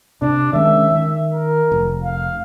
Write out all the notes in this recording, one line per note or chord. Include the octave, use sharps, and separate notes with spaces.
C3 D4
D#3 G#3 C#4 E5
D#3
A#4
F1
F5